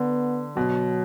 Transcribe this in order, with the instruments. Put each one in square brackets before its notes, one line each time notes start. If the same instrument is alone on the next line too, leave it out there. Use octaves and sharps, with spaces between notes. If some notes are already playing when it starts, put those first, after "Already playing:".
Already playing: [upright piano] D3 [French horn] B3
[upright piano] B2 [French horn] F#3